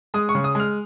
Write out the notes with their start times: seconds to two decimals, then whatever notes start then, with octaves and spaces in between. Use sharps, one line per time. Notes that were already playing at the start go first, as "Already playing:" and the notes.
0.14 G#3 D#6
0.29 C#6
0.35 C#3
0.44 D#6
0.55 G#3 F6